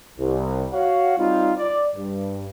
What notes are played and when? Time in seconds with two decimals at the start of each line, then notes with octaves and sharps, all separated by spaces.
0.18 C2
0.73 F#4 C#5 F5 F#5
1.17 G3 C4 D#4 F4
1.58 D5
1.95 G2